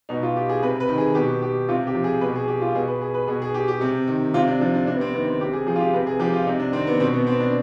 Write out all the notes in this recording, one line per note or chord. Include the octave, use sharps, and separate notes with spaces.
B2 D#4
F4
G4
G#4
C3 B4
B4
D#3
G#4
B2 G4
G4
C3 F4
G4
F3
G#4
B2 B4
G#4
G4
F4
B2 G#4
B4
G#4
B4
B2 G#4
G#4
G4
G4
C3
D#3
C3 F4
D4
F3 D4
D4
C3 D4
B3
C4
D#3 B3
C4
C3 G4
G#4
F3 G#4
F4
G4
C3 B4
G#4
F3 G4
F4
C3 D#4
D4
D#3 C4
B3
B2 C4
B3
C4
D4